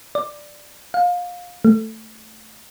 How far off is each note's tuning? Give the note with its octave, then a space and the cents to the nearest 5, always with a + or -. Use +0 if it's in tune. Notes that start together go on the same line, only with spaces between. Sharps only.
D5 +5
F5 +25
A3 +5